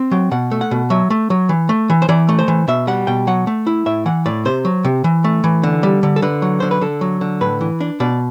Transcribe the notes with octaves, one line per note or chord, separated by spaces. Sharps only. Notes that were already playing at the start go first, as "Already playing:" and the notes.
Already playing: C4
F#3 G5
B2 F#5
A3
F#5
B2
F#3 E5
A3
F#3
E3
A3
E3
C5
E3 D5
A3
C5
E3
B2 E5
G3 F#5
B2 G5
F#3 F#5
A3
E4
A2 E5
E3 F#5
A2 D5
C3 C5
F#3
C3
E3
A3
E3
D3
G3
D3
A4
D3 B4
F#3
D3 C5
B4
D3 A4
F#3
D3
A2 B4
E3
D4
B2 D5